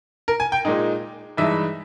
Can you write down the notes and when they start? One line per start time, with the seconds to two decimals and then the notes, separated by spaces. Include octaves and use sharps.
0.28 A#4
0.40 G#5
0.52 G5
0.65 A#2 G#3 D#4
1.37 G2 E3 G#3 D#4 E5